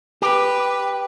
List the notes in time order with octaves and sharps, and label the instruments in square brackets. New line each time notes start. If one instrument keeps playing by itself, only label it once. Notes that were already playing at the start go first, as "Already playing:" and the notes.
[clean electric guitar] G4 [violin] B4